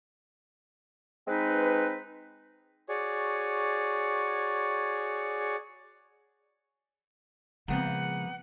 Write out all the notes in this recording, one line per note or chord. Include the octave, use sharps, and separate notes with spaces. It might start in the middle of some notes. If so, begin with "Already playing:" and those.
G#3 C4 D#4 B4
F#4 G#4 C#5 D5
A#2 C#3 F3 G#3 B3 C4 F#5